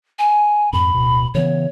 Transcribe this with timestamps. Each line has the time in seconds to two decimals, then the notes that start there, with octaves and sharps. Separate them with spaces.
0.19 G#5
0.73 F2 G#2 B5
0.94 D1 B2
1.34 C#3 E3 B3 C#5